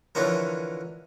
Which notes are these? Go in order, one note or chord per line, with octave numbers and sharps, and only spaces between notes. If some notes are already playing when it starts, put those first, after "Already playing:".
D3 E3 F3 C#4 A#4